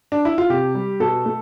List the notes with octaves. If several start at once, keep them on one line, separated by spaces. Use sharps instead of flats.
D4
E4
F4
C3 G4
G3
B2 A4
A3